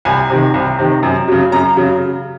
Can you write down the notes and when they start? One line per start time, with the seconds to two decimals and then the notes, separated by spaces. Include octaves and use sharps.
0.05 C2 G#5
0.29 C3 D#3
0.54 C2
0.79 C3 D#3
1.03 F#2
1.28 C#3 F#3
1.52 F#2 A#5
1.76 C#3 F#3